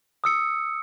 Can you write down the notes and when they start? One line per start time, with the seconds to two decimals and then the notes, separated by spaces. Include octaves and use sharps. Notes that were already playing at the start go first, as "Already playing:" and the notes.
0.24 D#6 E6 C#7